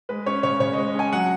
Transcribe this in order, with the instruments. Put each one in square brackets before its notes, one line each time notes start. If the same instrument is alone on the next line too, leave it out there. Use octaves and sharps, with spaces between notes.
[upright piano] G#3 B4
C#4 C#5
C#3 C#5
C#3 C#5
G#3 D#5
C#4 G#5
F#3 F#5